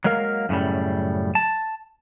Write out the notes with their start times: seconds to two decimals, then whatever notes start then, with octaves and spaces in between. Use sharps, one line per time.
0.04 F#3 G#3 A#3 A#4 F5
0.49 F#2 A2 C#3 G3
1.35 A5